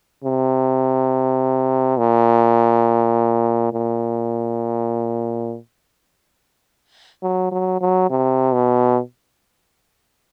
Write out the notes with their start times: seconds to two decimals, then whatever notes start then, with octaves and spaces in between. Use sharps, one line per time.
0.24 C3
1.98 A#2
3.73 A#2
7.23 F#3
7.51 F#3
7.81 F#3
8.10 C3
8.54 B2